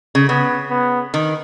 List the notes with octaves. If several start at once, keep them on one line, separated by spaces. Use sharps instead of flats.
C#3
C#3 B3
B3
D#3